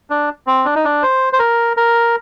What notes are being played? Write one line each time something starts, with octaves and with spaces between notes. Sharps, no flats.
D4
C4
D4
D#4
D4
C5
C5
A#4
A#4